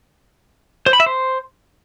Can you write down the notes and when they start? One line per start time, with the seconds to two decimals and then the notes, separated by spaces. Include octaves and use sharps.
0.86 C5
0.93 B5
1.00 E5
1.06 C5